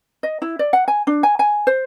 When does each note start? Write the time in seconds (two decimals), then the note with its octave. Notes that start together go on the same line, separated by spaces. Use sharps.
0.23 D#5
0.42 E4
0.59 D5
0.73 F#5
0.88 G#5
1.07 D4
1.23 G#5
1.39 G#5
1.67 C5